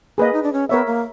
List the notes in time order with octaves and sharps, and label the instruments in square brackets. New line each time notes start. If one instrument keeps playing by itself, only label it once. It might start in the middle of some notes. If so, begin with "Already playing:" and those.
[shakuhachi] A#3 [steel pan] G#4 B4 D#5
[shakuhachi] D#4
D4
C#4
[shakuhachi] B3 [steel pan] A#4 C#5 E5
[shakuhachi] A#3